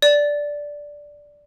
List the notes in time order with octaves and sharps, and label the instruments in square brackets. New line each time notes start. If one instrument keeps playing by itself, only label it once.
[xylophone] D5